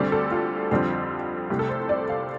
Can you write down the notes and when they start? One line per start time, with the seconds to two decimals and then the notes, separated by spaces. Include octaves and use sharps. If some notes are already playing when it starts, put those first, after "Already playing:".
Already playing: D2 D3 G3 C4 D5
0.12 A4
0.31 F4
0.71 F2 D3 G3 C4
1.50 C2 C3 A3 G4
1.59 A4
1.69 C5
1.89 D5
2.09 F5